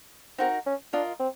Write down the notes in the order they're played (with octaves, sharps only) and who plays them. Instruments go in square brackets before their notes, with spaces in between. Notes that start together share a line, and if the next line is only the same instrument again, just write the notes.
[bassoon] C4 [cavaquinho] D#4 F#4 A#4
[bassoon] C#4
[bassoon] D4 [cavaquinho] F4 A#4 D#5
[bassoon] C4